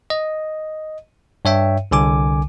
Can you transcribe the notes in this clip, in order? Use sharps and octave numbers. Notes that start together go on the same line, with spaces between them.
D#5
G2 C#5 E5 G5
C2 D3 G#5 D6